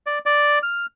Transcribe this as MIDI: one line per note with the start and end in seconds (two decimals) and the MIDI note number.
0.06 0.19 74
0.26 0.59 74
0.63 0.86 89